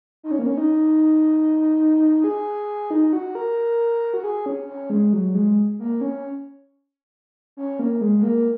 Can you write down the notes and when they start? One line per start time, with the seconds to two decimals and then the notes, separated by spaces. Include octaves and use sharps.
0.24 D#4
0.31 C#4
0.39 A#3
0.47 C#4
0.57 D#4
2.24 G#4
2.91 D#4
3.13 F#4
3.35 A#4
4.14 F#4
4.24 G#4
4.46 C#4
4.68 C#4
4.90 G#3
5.13 F#3
5.35 G#3
5.79 A#3
6.01 C#4
7.57 C#4
7.79 A#3
8.01 G#3
8.19 G#3
8.23 A#3